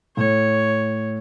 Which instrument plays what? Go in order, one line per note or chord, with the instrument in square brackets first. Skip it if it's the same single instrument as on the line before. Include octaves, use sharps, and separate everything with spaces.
[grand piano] A2 [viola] C#5